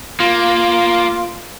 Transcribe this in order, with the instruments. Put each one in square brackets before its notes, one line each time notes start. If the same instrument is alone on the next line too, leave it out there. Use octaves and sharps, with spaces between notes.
[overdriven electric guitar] A#3 [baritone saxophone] F4